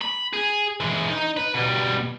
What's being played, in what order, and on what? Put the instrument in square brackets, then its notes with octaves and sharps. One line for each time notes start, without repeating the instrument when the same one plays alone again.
[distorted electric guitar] B5
G#4
E3 G#3
D#4
B4
B2 G3